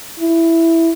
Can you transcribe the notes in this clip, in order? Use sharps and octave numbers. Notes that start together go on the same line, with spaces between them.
E4